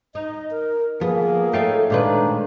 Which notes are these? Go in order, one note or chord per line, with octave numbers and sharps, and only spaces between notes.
D#4 D#5
A#4
F3 A#3 B3 G#4
A3 D#4 A4 C#5 E5 F5 G5
A#2 D#3 G#3 D4 B4